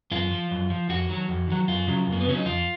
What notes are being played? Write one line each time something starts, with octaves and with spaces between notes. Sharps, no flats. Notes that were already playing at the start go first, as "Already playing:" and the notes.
F#2 F4
F3
F#2
F3
F2 F#4
D#3 F#3
F2
D#3 F#3
F#2 F4
C#3 F#3
F#2
A#3
B3
C#3 F#3 C#4
D#4
F2 F4